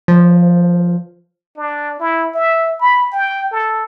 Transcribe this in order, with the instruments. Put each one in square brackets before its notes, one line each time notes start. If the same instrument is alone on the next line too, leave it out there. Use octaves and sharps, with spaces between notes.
[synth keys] F3
[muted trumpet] D4
E4
E5
B5
G5
A4